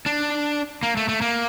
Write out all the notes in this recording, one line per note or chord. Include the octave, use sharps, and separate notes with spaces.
D4
A#3
A3
A3
A#3